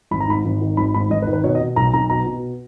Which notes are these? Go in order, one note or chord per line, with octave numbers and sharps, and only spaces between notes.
G#1 B5
A#5
G#2 B5
G#1
D#3
G#1 B5
G#2 B5
G#1 D#5
B4
D#3
B4
B2 C#5
D#5
B2
B1 A#5
B1 A#5
B2 A#5
B2